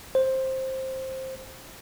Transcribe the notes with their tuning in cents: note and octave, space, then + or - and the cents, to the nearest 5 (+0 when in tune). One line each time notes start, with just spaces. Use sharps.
C5 +10